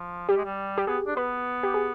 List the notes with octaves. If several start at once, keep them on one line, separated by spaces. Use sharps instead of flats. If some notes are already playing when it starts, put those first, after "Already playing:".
Already playing: F3
G3 G4
G#3
G3
G4
B3 G#4
D4
B3 B4
G4
G#4